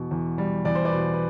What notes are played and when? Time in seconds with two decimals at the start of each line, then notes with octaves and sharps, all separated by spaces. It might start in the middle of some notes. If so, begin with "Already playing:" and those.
Already playing: E2 B2
0.11 E2
0.38 G3
0.65 E2 D5
0.75 C5
0.85 B4 D5
0.92 B2
1.14 B4